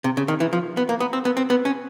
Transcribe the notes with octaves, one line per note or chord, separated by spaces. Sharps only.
C3
C#3
D#3
E3
F3
B3
A#3
B3
C4
B3
C4
B3
C#4